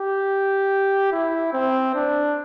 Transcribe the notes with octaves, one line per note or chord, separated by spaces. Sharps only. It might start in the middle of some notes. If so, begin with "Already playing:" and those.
Already playing: G4
E4
C4
D4